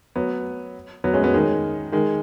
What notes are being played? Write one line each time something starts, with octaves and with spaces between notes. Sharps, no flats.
F#3 B3
F#3 B3
G#3 C#4
F#3 B3
D#3 G#3
D#3 G#3